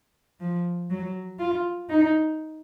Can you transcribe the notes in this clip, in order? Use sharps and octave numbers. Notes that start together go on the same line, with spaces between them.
F3
F#3
F4
D#4